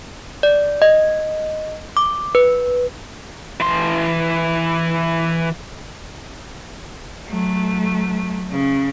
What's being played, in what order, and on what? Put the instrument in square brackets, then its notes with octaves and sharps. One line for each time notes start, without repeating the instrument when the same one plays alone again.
[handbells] D5
D#5
D6
B4
[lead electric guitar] E3 C6
[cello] F#3 A3
C#3